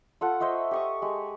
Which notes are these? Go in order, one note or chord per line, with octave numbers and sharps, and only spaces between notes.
F4 A4 F#5
C5 D#5 E5 C#6
G4 C#6 D#6
G#3 G4